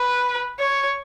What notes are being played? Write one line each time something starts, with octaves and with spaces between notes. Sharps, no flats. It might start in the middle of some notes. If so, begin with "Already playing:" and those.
Already playing: B4
C#5